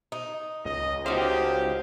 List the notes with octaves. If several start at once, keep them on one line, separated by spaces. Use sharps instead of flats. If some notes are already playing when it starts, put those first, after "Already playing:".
D#4
C#2 D#5
D#4 F#4 G4 C5 F5